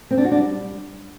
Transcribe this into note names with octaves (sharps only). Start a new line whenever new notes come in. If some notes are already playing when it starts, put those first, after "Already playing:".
C4
D4
F#4
D4
G3